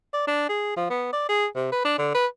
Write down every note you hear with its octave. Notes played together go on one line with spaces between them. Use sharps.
D5
D4
G#4
F3
B3
D5
G#4
C3
B4
D4
D3
B4